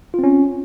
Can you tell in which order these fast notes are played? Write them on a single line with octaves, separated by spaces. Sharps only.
F4 C4 C#4